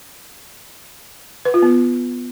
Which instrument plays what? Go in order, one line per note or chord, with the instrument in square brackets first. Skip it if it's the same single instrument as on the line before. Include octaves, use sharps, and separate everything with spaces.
[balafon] B4
F4
B3